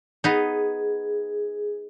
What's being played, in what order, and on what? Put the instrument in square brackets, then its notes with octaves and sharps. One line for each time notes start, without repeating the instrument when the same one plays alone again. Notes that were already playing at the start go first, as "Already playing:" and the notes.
[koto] B3 D#4 [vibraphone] G#4